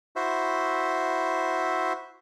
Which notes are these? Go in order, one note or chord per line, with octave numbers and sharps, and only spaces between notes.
E4 F#4 C5 E5